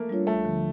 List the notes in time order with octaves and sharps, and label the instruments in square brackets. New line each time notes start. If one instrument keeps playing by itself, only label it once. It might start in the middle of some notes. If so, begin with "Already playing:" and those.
Already playing: [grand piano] A3 A#3
[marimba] G3 D4 F4 C#5
[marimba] D2 [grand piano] A3
[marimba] D3 F3